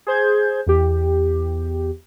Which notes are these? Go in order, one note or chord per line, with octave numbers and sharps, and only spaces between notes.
G#4 C5 G6 G#6
E2 G4